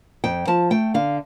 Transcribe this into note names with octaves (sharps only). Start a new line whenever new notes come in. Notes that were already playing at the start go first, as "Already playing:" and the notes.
F2 G5
F3 A5
A3 G5
D3 F5